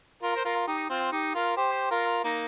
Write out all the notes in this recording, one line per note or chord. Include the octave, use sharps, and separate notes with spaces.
F4 A#4
C5
F4 A#4
D#4 G4
C4 F4
D#4 G4
F4 A#4
G4 C5
F4 A#4
A#3 D#4